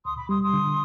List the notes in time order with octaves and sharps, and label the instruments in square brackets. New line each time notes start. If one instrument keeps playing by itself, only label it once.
[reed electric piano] D2 [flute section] C6 D#6
[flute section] B5 D6
[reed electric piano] G3 [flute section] C6 D#6
[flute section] C6 D#6
[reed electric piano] D3